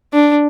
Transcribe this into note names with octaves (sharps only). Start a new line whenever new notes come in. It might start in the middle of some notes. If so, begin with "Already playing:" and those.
D4